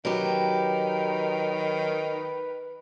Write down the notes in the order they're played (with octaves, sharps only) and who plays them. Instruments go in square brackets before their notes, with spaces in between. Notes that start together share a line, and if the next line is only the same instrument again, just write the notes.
[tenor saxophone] D#3 [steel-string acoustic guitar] F#3 G4 [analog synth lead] B4